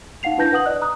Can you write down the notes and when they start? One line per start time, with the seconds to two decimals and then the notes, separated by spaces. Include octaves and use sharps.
0.23 D#4 F5 F#5 C7 F7
0.37 D4 E4 B4 A5 G6 A#6
0.52 B4 F#5 D#6 F#7
0.66 D5 D#5 F#6
0.82 A#5 D#6 F#6